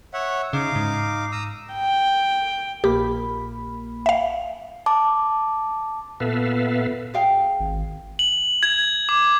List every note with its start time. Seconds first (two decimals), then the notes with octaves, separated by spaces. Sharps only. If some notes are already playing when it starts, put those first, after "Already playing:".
0.14 C#5 E5 F#5
0.53 C#3 D#4 F5 D6
0.76 G#2
1.32 A#5 D#6 E6
1.74 G5
2.84 A#1 A#3 G4 B5
4.06 E5 F5
4.86 A5 D6
6.20 A#2 B3 A4 B4 E5 F5
7.14 G#4 F5 G5
7.60 G#1
8.19 F#7
8.63 G#6
9.09 D6